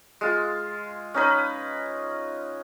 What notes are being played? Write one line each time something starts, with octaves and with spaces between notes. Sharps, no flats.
G#3 F4
C#4 D#4 B4